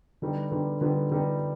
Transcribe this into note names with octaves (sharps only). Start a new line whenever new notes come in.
D3 G3 B3 D#4
D3 G3 B3 D#4
D3 G3 B3 D#4
D3 G3 B3 D#4